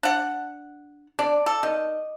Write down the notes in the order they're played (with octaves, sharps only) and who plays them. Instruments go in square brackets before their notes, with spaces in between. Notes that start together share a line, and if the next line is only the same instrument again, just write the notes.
[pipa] D4 F#5
[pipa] D4 [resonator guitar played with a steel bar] D5
[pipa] A4
[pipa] D#3 [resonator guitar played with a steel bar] D#5